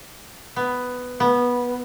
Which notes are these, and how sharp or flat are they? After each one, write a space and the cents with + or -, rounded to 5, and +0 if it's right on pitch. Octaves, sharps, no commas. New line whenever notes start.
B3 +10
B3 -15